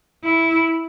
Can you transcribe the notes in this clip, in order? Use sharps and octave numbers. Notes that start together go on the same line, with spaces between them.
E4